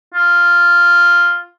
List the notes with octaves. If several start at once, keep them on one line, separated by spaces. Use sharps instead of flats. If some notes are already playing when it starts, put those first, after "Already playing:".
F4